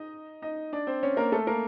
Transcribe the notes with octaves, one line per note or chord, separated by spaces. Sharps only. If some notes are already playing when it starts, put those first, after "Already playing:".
Already playing: D#4 D#5
D#4 D#5
D4 D5
C4 C5
C#4 C#5
A#3 A#4
A3 A4
A#3 A#4